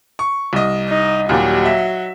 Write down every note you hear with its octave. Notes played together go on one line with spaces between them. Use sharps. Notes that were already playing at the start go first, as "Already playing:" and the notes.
C#6
C2 D#5
D#4
D#2 A#2 F#3 G3
E5